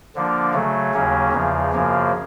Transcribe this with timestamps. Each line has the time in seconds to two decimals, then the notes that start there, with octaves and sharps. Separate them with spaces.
0.15 D3 F3 A#3 D4
0.54 C#3 F#3 A3
0.93 D#2 C#3 F#3 A#3 C#4
1.33 E2 C#3 F3
1.72 F#2 C#3 F3 A#3